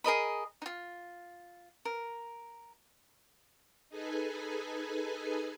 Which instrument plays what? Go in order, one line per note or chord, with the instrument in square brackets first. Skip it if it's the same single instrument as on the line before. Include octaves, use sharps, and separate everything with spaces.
[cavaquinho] G#4 A#4 D#5 B5
D#4 F4
A#4
[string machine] D#4 G#4 A4 B4 G#5